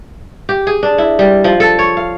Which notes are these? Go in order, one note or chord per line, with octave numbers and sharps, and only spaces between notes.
G4
G#4
D4
E4
G3
F3
A4
C#5
F5